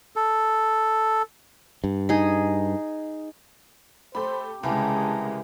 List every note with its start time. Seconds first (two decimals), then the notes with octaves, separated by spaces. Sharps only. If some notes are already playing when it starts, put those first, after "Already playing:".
0.16 A4
1.84 G2
2.09 D#4 G#4 D#5
4.15 A3 G4 C5 B5
4.63 C2 C#3 E3 G#3 G4 A#4 A5